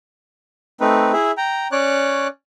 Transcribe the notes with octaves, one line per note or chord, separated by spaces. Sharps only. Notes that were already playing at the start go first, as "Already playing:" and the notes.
A3 C4 D#4 B4
E4 G#4 E5
G5 A#5
C#4 C#5 D5 D6 F#6